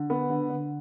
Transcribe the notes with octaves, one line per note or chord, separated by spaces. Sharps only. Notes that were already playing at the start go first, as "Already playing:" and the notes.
Already playing: D3
B3
D3
D3